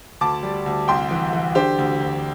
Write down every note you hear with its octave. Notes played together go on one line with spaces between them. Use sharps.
D2 A5 D6
G3
D2
C2 G5 C6
E3
E3
D3 G4 C5
D2
D2